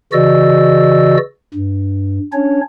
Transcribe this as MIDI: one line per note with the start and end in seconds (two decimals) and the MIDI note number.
0.13 1.17 49
0.13 1.17 52
0.13 1.17 66
0.13 1.17 74
0.13 1.17 75
0.13 1.17 88
1.54 2.19 43
2.33 2.61 61
2.33 2.61 62
2.33 2.61 73